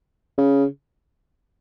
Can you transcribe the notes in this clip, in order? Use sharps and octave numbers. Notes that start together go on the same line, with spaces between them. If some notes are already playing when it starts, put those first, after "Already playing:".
C#3